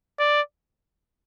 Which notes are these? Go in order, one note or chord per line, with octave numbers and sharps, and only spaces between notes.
D5